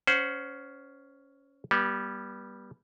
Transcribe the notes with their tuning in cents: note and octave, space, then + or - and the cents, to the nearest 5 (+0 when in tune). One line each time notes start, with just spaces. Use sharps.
C#4 +10 C5 -15 F#5 +0
G3 +0 B3 -35